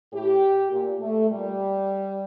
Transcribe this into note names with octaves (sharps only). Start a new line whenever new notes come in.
A2 G4
A#2
A3
A#2 G3